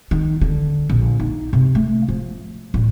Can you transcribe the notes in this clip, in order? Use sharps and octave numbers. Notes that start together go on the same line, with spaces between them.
D#3
D3
A#1
D#4
C3
A3
F3
A1